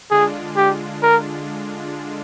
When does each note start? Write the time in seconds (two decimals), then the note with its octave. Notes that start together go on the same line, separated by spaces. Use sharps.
0.11 D3 G#3 D4 F4 G#4
0.57 G4
1.02 A#4